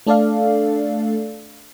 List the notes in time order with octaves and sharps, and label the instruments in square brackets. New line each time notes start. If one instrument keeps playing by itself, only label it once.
[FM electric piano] A3 D4 A4 D5 F5